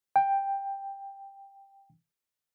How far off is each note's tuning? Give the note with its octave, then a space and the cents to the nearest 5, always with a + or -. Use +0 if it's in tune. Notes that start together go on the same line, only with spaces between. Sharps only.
G5 +10